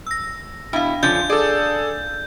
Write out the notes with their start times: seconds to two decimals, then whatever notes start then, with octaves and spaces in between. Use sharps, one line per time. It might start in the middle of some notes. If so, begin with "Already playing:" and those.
0.07 E6 A#6
0.73 B2 D4 E4 F5
1.03 D3 F3 C#4 G6
1.30 G#4 A4 D5